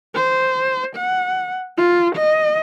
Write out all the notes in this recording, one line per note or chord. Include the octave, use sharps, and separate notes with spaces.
C5
F#5
F4
D#5